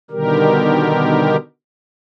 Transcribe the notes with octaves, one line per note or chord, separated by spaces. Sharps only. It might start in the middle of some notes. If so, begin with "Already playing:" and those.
B2 D3 D#3 G3 G4 A#4